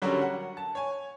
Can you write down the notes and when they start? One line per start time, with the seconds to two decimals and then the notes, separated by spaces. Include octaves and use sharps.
0.02 D3 F#3 G3 C#4 F#4 A#4
0.21 F#5
0.57 A5
0.75 C#5 G#5